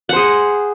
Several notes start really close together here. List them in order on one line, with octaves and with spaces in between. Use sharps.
F#5 C5 G#4